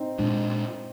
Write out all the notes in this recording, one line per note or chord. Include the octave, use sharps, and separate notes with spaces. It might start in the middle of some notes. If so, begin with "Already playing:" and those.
Already playing: C4 D#4
A#2 G#3 D4